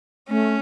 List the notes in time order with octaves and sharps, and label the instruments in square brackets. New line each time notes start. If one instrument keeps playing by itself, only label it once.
[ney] A3 [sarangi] C#4